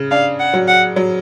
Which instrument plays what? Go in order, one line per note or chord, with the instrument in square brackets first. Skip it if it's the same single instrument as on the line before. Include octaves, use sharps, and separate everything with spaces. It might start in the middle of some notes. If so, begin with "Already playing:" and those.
Already playing: [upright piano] C#3
[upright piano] D4 [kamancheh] F5
[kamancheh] F#5
[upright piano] F#3
[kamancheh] F#5
[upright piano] F#3